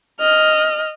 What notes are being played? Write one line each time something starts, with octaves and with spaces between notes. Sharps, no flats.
D#5 F6